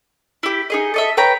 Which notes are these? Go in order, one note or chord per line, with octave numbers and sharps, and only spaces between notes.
E4 G4
D#4 G#4 D#5
A4 D#5 E5
B4 C#5 G5 A#5